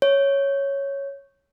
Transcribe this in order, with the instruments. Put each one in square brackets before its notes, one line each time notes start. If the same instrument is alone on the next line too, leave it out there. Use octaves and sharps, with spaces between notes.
[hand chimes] C#5